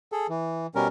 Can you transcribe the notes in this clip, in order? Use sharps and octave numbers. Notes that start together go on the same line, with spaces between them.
G#4 A4
E3
B2 G3 C#4 A#4